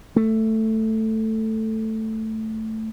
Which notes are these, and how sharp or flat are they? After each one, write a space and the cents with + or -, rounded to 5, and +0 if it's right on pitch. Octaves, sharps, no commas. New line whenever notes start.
A3 +5